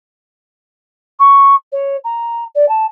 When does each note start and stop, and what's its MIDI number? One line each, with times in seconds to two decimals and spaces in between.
1.19 1.55 85
1.72 1.97 73
2.04 2.44 82
2.55 2.68 74
2.69 2.86 81